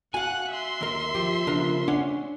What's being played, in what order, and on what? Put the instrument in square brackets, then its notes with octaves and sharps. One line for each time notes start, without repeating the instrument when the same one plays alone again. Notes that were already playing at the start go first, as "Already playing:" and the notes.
[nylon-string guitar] F#4 [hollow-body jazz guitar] F5 G#5 [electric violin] F#5 F#6
[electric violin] E5 C6
[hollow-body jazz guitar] D#2 A#4
[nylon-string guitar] F3 [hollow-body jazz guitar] G4
[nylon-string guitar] C#3 F3 B3 [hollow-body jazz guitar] D4 A#4
[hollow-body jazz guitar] C#4 D4 C#5 [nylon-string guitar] F#5 G#5